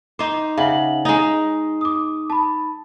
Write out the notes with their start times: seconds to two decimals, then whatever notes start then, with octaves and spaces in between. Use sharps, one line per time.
0.19 D#4 C5 D6
0.58 C#3 E5 F#5 F#7
1.05 G#3 D#4 D#6
1.81 D6 D#6
2.30 A5 B5